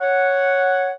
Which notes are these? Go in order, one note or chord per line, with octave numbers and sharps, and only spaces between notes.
C#5 F#5